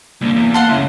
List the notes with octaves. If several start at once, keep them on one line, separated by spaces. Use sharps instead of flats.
C2 D3 A#3
E2
A4 F5 F#5 C6
A2 C#3 E5